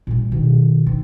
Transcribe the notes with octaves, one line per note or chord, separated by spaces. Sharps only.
A#2 G3
B2 D#3
D#3